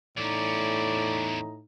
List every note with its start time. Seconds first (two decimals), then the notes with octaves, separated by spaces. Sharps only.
0.17 E2 A2 C#4 D#4 D5